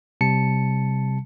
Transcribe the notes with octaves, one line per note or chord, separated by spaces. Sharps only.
C3 G3 A5 C#7